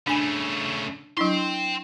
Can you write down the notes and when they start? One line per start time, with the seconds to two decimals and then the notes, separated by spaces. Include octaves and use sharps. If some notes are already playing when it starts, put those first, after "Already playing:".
0.07 C#3 A3 D4 G#5 B5
1.17 F#3 D4 E4 G5 C6